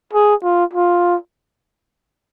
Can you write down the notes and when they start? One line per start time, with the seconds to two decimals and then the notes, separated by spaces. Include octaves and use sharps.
0.13 G#4
0.43 F4
0.73 F4